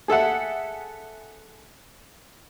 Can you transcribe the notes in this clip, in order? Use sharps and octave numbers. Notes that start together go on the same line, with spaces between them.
G#4 A4 E5 F#5